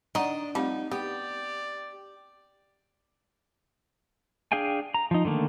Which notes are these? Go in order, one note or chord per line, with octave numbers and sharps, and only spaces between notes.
D#3 D4 D#4 D5 D#5 F#5 A#5
F3 G3 A3 C4 D#4
B3 G4 D5
D4 G#4 F5 G5 G#5
A#5
F3 D#4
D3 D#3 A3 A#3